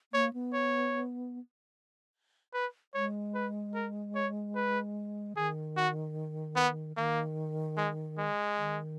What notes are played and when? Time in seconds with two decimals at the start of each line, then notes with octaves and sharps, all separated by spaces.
0.13 A#3 C#5
0.33 B3
0.53 C#5
2.54 B4
2.94 G#3 C#5
3.35 B4
3.75 A#4
4.15 C#5
4.55 B4
5.37 D#3 G#4
5.77 F#4
6.56 B3
6.96 D#3 A#3
7.77 G#3
8.18 G#3
8.57 D#3